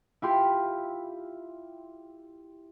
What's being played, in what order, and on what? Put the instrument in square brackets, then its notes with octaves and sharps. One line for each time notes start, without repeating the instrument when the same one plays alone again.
[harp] E4 F4 G4 B5 C6